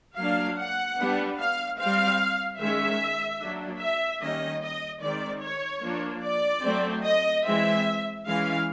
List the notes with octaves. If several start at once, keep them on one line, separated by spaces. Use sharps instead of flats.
F#3 A#3 D4 F5
F#5
G3 B3 D4
F5
G3 C4 F5
D#3 G#3 C#4 E5
F#3 A#3 D4
E5
D#3 G3 A#3 C#4 D#5
D#5
D#3 G#3 C4 D5
C#5
F3 A#3 D4
D5
F#3 A3 C4
D#5
E3 G#3 C4 E5
E3 G#3 C#4 F5